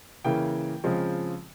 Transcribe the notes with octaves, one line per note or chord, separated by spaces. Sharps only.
C#3 E3 A#3 G5
C#3 F3 G#3 C4